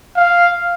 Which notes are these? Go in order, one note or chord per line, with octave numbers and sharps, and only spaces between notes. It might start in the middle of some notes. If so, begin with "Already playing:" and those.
F5